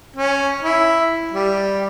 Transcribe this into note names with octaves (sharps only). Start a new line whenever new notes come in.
C#4
E4
G3